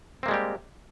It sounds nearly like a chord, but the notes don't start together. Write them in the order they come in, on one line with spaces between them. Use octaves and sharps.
C4 A#3 G#3 G3 G4